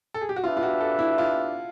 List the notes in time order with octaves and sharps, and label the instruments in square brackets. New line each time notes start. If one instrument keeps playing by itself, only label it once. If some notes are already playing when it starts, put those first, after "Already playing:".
[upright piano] A4
G#4
G4
F#4
[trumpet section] D4 G4 B4 E5 [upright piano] F4
[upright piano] F4
F#4
A4
E4
F4